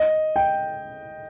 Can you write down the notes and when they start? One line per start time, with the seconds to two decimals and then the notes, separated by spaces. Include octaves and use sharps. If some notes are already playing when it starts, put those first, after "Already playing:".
Already playing: D#5
0.36 G5